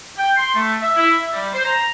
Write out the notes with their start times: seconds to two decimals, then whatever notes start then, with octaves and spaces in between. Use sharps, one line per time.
0.17 G5
0.37 C6
0.55 A3
0.81 E5
0.96 E4
1.20 E5
1.33 G3
1.53 C5
1.65 A#5